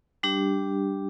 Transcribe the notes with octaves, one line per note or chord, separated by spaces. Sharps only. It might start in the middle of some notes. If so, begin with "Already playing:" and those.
G3 D4 G4